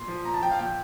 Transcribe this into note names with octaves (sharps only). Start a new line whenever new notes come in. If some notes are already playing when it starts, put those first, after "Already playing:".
Already playing: A#2 C6
F3
A#2 A#5
A5
F3 G5
F5
A#2 G5